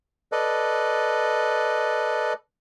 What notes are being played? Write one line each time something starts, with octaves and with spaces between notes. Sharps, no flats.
A4 B4 D5 D#5